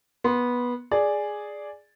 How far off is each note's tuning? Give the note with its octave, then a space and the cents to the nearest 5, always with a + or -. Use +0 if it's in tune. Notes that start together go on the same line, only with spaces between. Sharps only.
B3 -15 C6 +0
G#4 +0 D5 +0